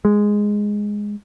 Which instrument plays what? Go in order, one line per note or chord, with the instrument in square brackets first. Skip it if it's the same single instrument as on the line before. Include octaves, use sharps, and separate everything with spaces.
[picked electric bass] G#3